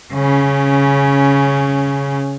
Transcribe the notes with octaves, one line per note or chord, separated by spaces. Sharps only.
C#3 C#4